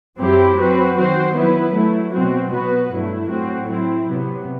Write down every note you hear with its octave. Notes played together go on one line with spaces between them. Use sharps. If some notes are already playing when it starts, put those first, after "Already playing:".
F#2 F#3 C4 E4 G4
F#3 C4 F#4 B4
D#3 F#3 C4 F#4 C5
F#3 B3 E4 B4
F#3 A3 E4
B2 F#3 C4 F#4
F#3 B3 F#4 B4
G2 F#3 A3 E4
A2 F#3 C4 F#4
F#3 C4 E4
C3 F#3 B3